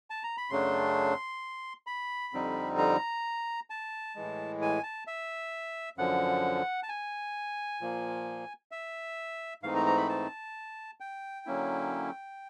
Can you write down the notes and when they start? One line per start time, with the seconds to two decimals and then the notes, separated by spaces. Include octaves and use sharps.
0.10 A5
0.23 A#5
0.38 B5
0.50 F#2 C#3 F#3 A3 D4 C6
1.87 B5
2.33 F2 D3 G3 C4 D#4
2.78 A#5
3.70 A5
4.16 A2 E3 G#3
4.62 G#5
4.83 A5
5.07 E5
5.97 F#2 D3 F3 F#5
6.83 A5
6.89 G#5
7.81 A#2 F3 A#3
8.71 E5
9.63 G#2 E3 A3 C4 D#4 F5
9.75 A#5
9.86 A#5
9.97 B5
10.09 A5
11.00 G5
11.46 D3 F#3 A#3 C#4 E4